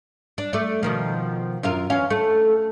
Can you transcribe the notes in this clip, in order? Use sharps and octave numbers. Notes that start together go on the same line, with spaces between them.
D4
A3 D5
B2 D#3 F3
F#2 F4 A#4
E2 C#4 F5
A3